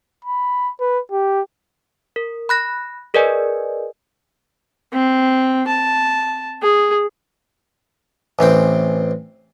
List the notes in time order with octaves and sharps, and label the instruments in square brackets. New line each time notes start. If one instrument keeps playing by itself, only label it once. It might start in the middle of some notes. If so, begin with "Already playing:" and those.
[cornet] B5
B4
G4
[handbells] A#4
B5 F#6 A#6
G#4 A#4 B4 D5 D#5 G#5
[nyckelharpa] C4
A5
G#4
[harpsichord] A1 E3 C4 G5